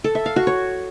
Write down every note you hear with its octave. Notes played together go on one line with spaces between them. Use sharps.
A4
E5
F5
F#4
C#5